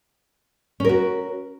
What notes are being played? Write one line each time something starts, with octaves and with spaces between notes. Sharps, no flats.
C#4 F#4 A#4